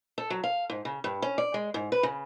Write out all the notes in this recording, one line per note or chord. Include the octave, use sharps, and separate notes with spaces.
A4
F#3
F5
G#2
C#3
G2
C#4
D5
G#3
G#2
B4
C#3